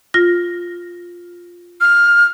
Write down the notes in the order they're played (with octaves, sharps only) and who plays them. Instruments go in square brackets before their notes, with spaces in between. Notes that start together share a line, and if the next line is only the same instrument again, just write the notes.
[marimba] F4 A#6
[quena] F6